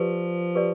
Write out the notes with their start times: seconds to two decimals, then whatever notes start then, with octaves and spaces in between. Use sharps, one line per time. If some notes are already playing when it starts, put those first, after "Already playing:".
Already playing: F3 G4 B4 D5
0.55 G4 B4 D5